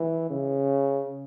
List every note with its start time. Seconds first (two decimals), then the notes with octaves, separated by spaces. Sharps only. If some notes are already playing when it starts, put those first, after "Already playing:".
Already playing: E3
0.30 C#3